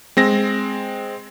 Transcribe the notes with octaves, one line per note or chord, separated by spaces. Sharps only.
G#3 C4 A#6